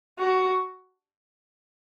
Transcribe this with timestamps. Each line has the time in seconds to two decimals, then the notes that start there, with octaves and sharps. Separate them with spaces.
0.19 F#4